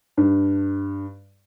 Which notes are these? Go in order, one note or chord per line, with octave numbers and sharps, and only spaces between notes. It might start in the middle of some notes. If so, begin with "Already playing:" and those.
G2